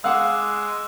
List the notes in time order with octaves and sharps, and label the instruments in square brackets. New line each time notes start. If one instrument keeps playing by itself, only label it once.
[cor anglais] G#3 [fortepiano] F5 F#5 [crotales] D6 F#6 [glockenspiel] E6